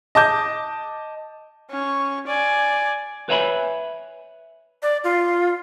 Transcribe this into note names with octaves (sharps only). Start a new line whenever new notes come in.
D#5 A5 D6 G6
C#4 C#6
D5 G#5
B4 C#5 E5 G#5 A#5 B5
D5
F4